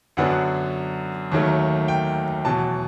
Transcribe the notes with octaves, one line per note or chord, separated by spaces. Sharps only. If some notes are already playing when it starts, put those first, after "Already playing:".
F#2 D3 F#3 B3 D4 F#5
D#2 D#3 F#3 A3
G5
E2 B2 F#3 A5